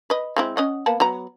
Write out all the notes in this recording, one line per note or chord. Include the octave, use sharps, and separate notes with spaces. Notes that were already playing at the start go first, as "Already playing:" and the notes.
B4 D#5
G#3 C4 E4
C#4 D#5 F#5
A#3 B3 A5
F#3 B3 A#5